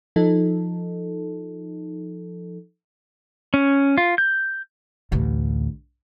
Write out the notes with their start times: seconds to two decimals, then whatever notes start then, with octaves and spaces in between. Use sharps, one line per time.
0.16 F3 D#4 A4
3.54 C#4
3.98 F4
4.18 G6
5.12 A1 D2